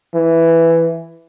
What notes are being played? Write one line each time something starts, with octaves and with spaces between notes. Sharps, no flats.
E3